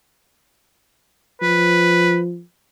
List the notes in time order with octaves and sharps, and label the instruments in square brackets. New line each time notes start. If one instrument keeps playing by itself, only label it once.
[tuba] F3 [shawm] B4